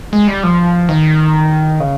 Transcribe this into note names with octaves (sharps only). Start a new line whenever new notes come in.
G#3
G3
F3
D#3
C#3